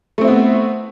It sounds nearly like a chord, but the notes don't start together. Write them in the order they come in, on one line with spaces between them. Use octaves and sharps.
A3 C4 E4 B3